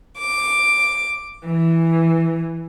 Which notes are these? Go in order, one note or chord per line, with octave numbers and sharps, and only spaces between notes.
D6
E3